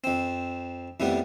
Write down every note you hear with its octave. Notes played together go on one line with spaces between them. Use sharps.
F2 C4
F2 A2 G3 B3